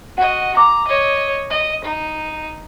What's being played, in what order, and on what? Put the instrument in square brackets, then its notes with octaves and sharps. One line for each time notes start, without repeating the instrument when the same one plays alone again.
[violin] F#4 D#5 [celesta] F#5
[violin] A#5 [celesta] D6
[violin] C#5 D#5
D#5
D#4